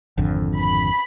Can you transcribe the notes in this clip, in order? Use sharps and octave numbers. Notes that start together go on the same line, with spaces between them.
G#1 F2 D3
B5